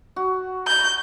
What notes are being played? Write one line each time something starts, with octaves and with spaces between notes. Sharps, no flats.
F#4
G6